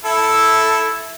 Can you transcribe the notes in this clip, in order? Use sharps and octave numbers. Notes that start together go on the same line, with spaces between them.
E4 A4